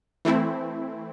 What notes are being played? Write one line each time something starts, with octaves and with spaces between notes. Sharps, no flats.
E3 A3 C4 E4